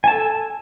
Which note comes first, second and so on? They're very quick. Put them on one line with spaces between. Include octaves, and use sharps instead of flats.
G#5 A5 A4